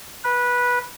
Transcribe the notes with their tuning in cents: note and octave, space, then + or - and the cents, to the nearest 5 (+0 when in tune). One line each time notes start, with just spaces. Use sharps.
B4 -15